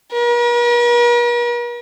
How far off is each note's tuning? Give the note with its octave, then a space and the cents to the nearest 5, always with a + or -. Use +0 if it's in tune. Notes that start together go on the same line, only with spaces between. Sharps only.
A#4 +45